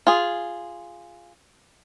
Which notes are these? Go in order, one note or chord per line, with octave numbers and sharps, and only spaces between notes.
F4 G#4